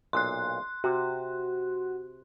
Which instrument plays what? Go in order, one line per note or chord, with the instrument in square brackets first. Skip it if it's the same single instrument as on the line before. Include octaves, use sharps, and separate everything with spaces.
[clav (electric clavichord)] B1 A#2 [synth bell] C6 F#6
[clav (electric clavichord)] C3 [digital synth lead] F#4